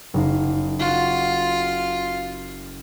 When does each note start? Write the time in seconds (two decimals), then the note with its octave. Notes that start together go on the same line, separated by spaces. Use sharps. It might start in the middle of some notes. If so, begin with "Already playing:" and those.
0.14 F#1 D#4 F5
0.80 F4 F#4 E7